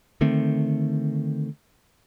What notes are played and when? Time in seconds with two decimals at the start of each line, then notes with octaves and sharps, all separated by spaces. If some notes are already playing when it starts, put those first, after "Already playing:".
0.21 D3 D#3 A3 C4